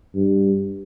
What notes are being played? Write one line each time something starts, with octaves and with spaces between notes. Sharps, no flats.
G2